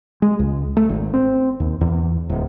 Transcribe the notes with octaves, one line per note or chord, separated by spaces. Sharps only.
G#3
C#2
A3
G#1
C4
D#2
E2
D1